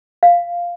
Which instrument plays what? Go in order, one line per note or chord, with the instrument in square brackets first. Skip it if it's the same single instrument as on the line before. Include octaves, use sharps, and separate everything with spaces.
[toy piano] F5